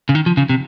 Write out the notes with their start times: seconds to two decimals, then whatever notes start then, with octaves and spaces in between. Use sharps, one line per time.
0.09 C#3
0.15 D#3
0.26 F3
0.37 C#3
0.50 C3